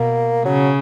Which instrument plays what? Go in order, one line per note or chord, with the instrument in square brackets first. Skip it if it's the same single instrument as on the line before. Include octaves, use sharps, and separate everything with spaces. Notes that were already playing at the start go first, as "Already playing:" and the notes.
Already playing: [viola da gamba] B2 [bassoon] A#3
[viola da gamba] C#3 [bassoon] F#3